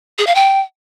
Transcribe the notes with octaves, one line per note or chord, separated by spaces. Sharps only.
G#4
F5
G5